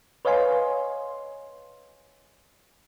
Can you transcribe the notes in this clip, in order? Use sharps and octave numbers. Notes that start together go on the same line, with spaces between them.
B4 C#5 D#5 F5 G#5 C6